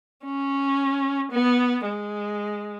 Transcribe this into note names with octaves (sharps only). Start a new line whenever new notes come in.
C#4
B3
G#3